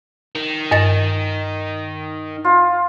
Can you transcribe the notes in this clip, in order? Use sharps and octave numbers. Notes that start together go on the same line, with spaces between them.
D#3
G2 D#5 A6
F4